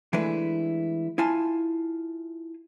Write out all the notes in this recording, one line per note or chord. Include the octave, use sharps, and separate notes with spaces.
E3 G#3 A3 D4 E4 B4
E4 F4 G#5 A5